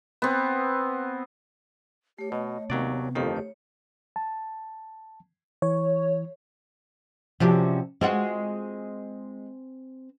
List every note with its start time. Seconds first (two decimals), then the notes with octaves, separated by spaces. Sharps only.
0.22 B3 C4
2.19 A3 G4 C#5
2.32 B2 D#5
2.70 D#2 C3 F#3 B3 D5
3.15 G1 F2 D#3 A3 G4 A4
3.36 C#5
4.16 A5
5.62 E3 C#5
7.40 C3 F3 C#4 D4 F#4 G4
8.01 G#3 C4 F4 F#4 G#5